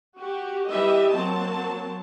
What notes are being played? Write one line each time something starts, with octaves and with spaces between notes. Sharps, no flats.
F#4 G4
E3 G3 G4 D#5 E5
F#3 A#3 C4 A5